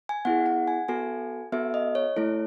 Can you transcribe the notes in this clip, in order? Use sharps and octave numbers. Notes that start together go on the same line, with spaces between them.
G#5
B3 E4 G#4 F#5
F#5
G#5
B3 F#4 A4 G#5
B3 F#4 A4 E5
D#5
C#5
A3 E4 A4 C#5